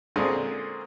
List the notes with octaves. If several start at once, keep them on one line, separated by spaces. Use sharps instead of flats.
A#2 D3 G#3 C4 C#4